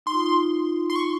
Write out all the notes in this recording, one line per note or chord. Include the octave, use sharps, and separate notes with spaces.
D#4 C6
F4
D#4
C6
C#6